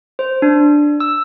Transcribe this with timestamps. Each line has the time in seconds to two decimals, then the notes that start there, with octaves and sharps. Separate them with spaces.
0.19 C5
0.42 D4
1.00 E6